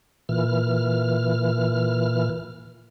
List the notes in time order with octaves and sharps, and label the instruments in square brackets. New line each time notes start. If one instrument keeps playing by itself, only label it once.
[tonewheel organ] A#2 E3 F6